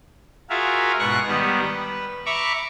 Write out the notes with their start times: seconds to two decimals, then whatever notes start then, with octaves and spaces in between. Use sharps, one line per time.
0.50 F4 F#4 G#4 A#4 E5 F5
0.99 G#2 B2 C#6 F#6 A#6
1.28 D#3 G3 B3
1.61 B4
2.26 E5 A#5 B5 C#6 D6